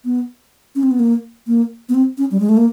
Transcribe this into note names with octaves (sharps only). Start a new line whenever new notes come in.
B3
C#4
C4
B3
A#3
A#3
B3
C4
C#4
G3
G#3
A3
A#3